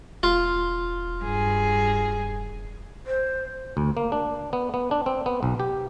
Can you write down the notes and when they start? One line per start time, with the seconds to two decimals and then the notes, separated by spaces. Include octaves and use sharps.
0.23 E1 F4
1.24 G2 G#4
3.07 C5
3.77 D2
3.97 A#3
4.12 D4
4.53 B3
4.74 B3
4.91 D4
5.06 C4
5.26 B3
5.43 B1
5.60 G4